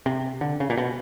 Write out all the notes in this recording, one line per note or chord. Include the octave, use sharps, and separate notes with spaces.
C3
D3
C#3
A#2
B2